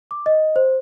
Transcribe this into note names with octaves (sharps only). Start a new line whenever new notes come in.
D6
D#5
C5